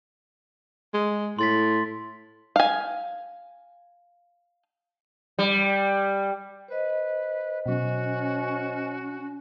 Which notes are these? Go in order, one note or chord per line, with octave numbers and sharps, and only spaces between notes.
G#3
A2 C6 A6 B6
F5 G#5
G3
B4 C5 D#5
B2 F#3 C#4 F#4